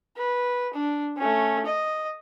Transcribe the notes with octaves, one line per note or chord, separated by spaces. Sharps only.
B4
D4
A3 C#4
D#5